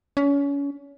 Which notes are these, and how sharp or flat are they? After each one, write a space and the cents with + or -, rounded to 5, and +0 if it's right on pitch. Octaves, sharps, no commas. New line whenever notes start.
C#4 +30